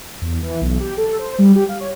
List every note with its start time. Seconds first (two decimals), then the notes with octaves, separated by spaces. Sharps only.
0.22 E2
0.42 E3
0.61 B1
0.80 G4
0.97 A4
1.19 C5
1.38 G3
1.55 G4
1.69 F5
1.80 C#5